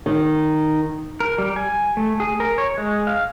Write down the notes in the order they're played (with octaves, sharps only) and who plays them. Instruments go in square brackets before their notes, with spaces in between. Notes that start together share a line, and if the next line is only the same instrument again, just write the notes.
[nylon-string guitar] D#3
[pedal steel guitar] A#4
G3
G#5
A3
G#4
A#4
C#5
G#3
F5